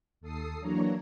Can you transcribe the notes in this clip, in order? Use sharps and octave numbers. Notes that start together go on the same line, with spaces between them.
D#2 A4 D#6 C7
E3 F#3 A#3 D4 C#5 A#5